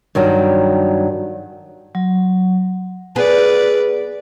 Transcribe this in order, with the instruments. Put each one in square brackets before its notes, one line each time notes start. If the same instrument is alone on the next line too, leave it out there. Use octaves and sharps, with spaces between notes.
[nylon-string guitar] G2 D#3 F#3 G3
[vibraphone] F#3
[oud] B3 G#4 [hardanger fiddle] B4 D5